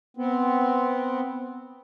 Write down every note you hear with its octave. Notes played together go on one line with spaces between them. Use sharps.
B3 C4